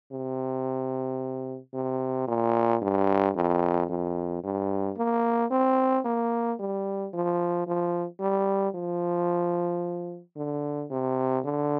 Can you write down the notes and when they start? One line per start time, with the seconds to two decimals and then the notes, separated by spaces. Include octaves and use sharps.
0.12 C3
1.74 C3
2.27 A#2
2.82 G2
3.36 F2
3.89 F2
4.43 G2
4.97 A#3
5.51 C4
6.05 A#3
6.59 G3
7.13 F3
7.67 F3
8.20 G3
8.75 F3
10.36 D3
10.90 C3
11.44 D3